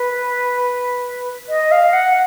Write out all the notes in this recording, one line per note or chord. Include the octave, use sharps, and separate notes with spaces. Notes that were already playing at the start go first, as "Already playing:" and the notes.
Already playing: B4
D#5
F5
F#5